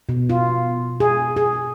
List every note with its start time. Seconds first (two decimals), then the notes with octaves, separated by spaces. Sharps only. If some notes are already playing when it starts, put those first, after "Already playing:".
0.09 B2
0.30 F4
1.00 G#4
1.37 G#4